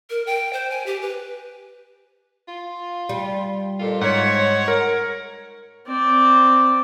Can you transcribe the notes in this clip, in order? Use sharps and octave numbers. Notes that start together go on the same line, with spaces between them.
A#4
G5
C5
G#5
G4
B4
F4
G3
F2 A#2 F4 A4
G#2 C5 C#5 F#5
A#4
C4 D5